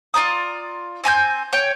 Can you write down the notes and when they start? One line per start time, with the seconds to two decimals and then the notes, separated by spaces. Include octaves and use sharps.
0.14 F4 D5 A#5 D#6
1.04 C4 G#5 A#5 G6
1.53 C#5 G5